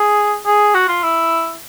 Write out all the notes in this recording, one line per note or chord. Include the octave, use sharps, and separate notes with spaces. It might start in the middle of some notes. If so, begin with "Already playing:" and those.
Already playing: G#4
G#4
F#4
F4
E4